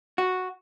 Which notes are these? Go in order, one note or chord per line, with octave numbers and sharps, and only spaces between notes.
F#4